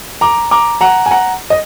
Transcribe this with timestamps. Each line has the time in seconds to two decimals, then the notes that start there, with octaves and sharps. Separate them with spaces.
0.21 A#5 D6
0.51 A#5 D6
0.81 F#5 A#5
1.06 G#5
1.11 F#5 A#5
1.50 D#5